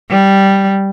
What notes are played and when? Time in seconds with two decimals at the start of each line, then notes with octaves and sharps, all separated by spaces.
0.10 G3